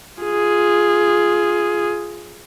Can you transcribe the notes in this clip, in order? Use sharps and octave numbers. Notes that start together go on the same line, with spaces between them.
F4 G#4